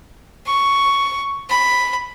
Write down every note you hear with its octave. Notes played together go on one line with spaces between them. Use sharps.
C#6
B5